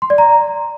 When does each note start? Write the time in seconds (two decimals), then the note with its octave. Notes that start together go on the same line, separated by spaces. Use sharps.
0.02 C6
0.10 D5
0.18 A#5